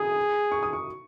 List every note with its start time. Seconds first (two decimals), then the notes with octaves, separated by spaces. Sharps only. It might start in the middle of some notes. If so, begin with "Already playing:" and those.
Already playing: G#4 D#6
0.52 C#6
0.63 D#6
0.73 C#6